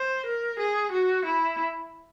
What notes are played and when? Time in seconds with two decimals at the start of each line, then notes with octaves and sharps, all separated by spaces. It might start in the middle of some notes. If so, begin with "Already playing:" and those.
Already playing: C5
0.26 A#4
0.59 G#4
0.92 F#4
1.25 E4